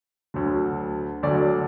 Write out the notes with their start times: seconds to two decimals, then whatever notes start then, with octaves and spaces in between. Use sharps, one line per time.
0.34 D2 D3 F#3
1.23 D2 D3 F#3 D5